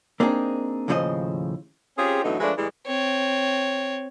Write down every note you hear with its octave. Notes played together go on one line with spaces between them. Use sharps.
A#3 C4 D4 D#4 G#4
D#2 A2 C#3 F3 C5 D#5
C4 C#4 F4 G4 G#4
A2 D3 E3 F#3 B3 D#4
F3 G#3 A3 D4 B4
A2 E3 G3 G#3
C4 C#5